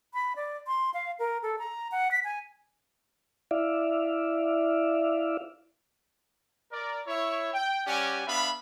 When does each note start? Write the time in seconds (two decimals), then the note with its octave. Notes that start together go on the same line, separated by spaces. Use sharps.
0.14 B5
0.36 D5
0.67 C6
0.94 F5
1.19 A#4
1.43 A4
1.59 A#5
1.92 F#5
2.11 B6
2.24 G#5
3.51 E4 D5 E5 F5
6.72 A#4 D5
7.07 E4 C#5 E5
7.54 G5
7.87 G3 C#4 G4 D5 F#5 G#5
8.27 B3 D4 E5 F5 B5